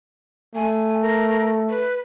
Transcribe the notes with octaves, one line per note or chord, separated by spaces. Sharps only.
A3 G#5
A#4
B4